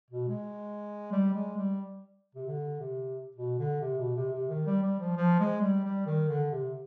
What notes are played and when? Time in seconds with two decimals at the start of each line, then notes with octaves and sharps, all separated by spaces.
0.10 B2
0.28 G#3
1.12 G3
1.34 G#3
1.57 G3
2.35 C3
2.47 D3
2.80 C3
3.36 B2
3.59 D3
3.81 C3
3.98 B2
4.16 C3
4.33 C3
4.49 D#3
4.66 G3
4.83 G3
5.00 F3
5.17 F3
5.39 G#3
5.62 G3
5.84 G3
6.06 D#3
6.29 D3
6.52 C3